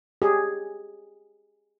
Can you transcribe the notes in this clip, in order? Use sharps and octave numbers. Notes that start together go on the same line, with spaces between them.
G4 G#4